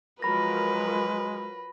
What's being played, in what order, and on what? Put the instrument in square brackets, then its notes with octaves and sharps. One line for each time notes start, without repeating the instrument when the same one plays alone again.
[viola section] F3 F#3 A#4 [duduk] G#3 [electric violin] B4 [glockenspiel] B5 A#6